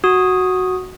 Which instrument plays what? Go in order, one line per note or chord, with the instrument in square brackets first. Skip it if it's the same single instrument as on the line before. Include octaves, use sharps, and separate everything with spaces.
[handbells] F#4 D#6